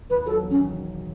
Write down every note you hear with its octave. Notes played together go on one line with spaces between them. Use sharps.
D#2 B4
F#3 A4
E1
C#4
D#3